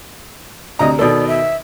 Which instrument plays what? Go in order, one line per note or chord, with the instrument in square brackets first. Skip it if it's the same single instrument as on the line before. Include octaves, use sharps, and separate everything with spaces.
[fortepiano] D2 C3 A#5 [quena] D#5
[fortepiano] B2 D#3 A4 [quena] D5
[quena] E5